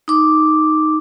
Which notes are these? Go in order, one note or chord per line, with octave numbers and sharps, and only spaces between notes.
D#4 D6